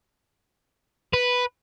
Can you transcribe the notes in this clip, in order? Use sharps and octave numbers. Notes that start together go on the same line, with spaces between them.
B4